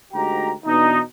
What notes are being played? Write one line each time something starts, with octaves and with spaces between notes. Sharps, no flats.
D2 G#2 F#4 G4 G5 A#5
B2 E3 D4 D#4